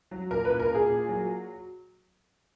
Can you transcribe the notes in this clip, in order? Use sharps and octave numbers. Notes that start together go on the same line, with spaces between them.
F#3
A#2 A#4
A#2 B4
A#4
A#2 G#4
A#2
F#3